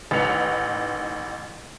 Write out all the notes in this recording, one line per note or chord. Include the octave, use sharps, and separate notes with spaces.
A1 D#3 B4 C#7 F7